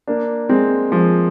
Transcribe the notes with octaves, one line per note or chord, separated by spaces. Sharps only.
A#3 D4
G#3 C4
F3 G#3